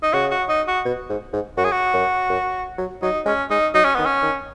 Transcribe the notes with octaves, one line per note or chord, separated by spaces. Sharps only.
D#4
C#3 F#4
F#4
D#4
F#4
B2
G#2
G#2
F#2 F#4
G#4
F#4
F#2
F#2
F#3
F#3 D#4
G#3 C#4
G#3 D#4
F#3 D#4
C#4
D#3 B3
C#4
D#3